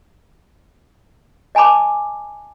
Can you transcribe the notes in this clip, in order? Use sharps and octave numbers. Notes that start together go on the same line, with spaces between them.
D#5 G#5 A5 B5 D6